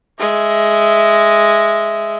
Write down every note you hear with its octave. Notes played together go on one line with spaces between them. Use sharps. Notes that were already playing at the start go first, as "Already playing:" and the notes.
G#3 E5